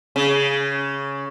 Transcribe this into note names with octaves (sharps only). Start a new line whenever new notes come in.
C#3